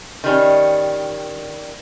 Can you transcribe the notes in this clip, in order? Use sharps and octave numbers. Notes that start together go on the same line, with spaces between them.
D#3 G3 C#4